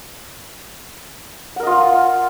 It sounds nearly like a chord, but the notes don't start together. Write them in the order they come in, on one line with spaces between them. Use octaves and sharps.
F#5 A#4 D#5 F4